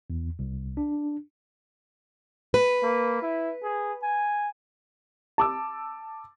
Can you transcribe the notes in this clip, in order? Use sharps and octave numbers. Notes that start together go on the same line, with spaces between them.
E2
C2
D4
B4
A#3
E4
G#4
G#5
A5 D6 E6